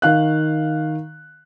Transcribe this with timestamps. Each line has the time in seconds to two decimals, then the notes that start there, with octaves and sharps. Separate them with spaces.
0.02 D#3 F5 F#6